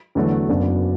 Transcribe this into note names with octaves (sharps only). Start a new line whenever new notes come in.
E2 D3 F#3 A3 F#4
F#1 F#2 F#3 B3 D4